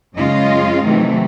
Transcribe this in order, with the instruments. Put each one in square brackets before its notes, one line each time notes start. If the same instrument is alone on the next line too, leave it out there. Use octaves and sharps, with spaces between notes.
[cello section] F#2 C#3 G#3 C#4 F4 D#5
C3 D#3 E3 F#3 A3